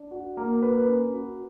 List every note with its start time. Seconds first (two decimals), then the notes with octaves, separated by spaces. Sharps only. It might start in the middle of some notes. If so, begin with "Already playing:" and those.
Already playing: D4
0.11 F#4
0.37 A#3
0.62 B4
0.87 C#4
1.13 F#4